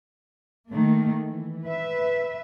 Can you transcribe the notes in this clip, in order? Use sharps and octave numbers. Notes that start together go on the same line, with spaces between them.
D#3 A3 A#3
E3
B4 E5